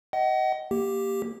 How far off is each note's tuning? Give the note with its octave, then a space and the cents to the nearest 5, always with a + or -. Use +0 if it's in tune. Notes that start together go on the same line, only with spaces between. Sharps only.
D#5 +15 F#5 +35
A#3 +0 G4 +0